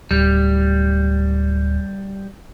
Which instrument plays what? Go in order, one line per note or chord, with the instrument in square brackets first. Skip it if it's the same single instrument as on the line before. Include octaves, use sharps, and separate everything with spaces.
[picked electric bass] D1 [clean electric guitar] G3